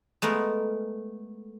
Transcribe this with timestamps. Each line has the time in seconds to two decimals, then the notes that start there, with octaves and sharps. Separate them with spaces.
0.22 G#3 A3 B3 A#4